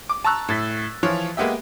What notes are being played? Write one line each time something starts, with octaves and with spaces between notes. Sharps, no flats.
D6
A5 A#5 C#6 E6 F#6
A2 A6 B6
E3 F3 F4 C#5 F7
G#3 A#3 B3 G4 E5